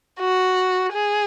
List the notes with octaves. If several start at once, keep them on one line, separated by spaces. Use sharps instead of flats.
F#4
G#4